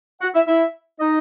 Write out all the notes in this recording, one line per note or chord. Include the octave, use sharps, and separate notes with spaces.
F#4 F#5
E4 E5
E4 E5
D#4 D#5